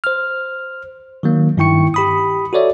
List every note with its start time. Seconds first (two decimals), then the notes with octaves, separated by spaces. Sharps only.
0.04 C5 F6
1.23 D#3 F#3 A#3
1.57 G2 D#3 E4 G5 C#6 C#7
1.94 G4 B5 D#6
2.53 F#4 A4 C#5 D5 E5